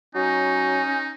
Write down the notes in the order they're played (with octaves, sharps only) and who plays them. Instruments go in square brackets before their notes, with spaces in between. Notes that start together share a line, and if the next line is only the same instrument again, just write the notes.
[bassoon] F#3 [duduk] C#4 [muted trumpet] D#4